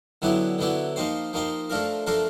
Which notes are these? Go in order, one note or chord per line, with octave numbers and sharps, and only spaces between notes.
D3 F#3 B3 E4 G4
D3 F#3 B3 E4 G4
F3 A#3 D#4 G4 C5
F3 A#3 D#4 G4 C5
F3 A3 D4 F4 A#4
F3 A3 D4 F4 A#4